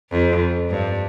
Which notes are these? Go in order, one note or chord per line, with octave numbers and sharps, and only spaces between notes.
F2
G2